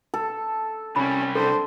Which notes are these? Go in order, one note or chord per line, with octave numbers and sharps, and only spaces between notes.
A4
C2 G3 C#4 B5
D4 A4 C5